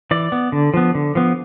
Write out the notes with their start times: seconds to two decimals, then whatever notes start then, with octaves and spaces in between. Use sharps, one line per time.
0.11 E3 D5
0.32 B3
0.52 D3
0.74 F3 B3
0.95 D3
1.15 F3 B3